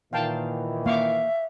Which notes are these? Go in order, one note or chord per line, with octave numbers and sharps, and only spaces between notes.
A#2 D#3 E3 F5 G5 A5
A#3 E5 F5 C#6 D6